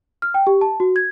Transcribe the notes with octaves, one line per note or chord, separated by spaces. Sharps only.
F6
G5
G4
A5
F#4
G#6